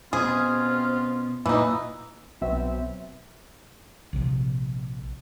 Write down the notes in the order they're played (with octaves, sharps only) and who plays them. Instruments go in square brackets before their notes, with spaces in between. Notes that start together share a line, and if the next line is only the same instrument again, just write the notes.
[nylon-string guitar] B2 [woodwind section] C4 C#4 F4 [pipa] G#4
[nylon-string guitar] A#2 [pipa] E3 D#4
[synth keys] B1 B2 F#3 C4 E5
[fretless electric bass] A#1 C3 E3 F3